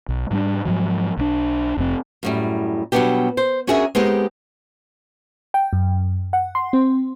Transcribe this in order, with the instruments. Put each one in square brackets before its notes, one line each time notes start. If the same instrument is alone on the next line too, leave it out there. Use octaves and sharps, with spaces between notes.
[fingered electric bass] B1
G#2 G3 D4
G#2 F3 F#3
B1 E3 D4
F1 F2 C4
[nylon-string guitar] F#2 A2 G3
B2 F#3 G3 B3 D4 G4
C5
C#4 D4 F#4 G#4 A#4 E5
G#3 B3 C4 D#4 G4 A#4
[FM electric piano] G5
F#2
F#5
C6
C4